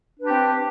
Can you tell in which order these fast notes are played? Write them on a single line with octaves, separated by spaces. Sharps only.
D4 B4 G4 C4